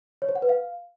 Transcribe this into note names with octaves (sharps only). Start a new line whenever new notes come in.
C#5
C5
F#5
B4
F5